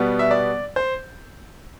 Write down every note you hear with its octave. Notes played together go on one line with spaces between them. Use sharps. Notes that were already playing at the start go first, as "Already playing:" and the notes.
Already playing: B2 G3 B3
E5
D5
C5